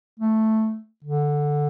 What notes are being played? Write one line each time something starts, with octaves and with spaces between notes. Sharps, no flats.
A3
D3